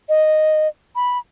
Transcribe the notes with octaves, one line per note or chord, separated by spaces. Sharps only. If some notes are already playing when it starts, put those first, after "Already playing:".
D#5
B5